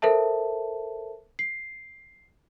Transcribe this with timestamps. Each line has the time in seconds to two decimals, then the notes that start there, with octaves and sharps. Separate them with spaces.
0.02 A4 A#4 C5 E5 A5
1.39 C7